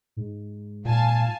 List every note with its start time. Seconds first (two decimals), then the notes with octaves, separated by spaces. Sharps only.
0.16 G#2
0.85 A#2 F5 G#5 A5